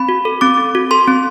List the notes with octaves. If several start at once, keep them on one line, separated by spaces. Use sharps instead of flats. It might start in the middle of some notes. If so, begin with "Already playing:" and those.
Already playing: C4 B5
F#4
A4
C4 D6
C4
F#4
A4 C6
C4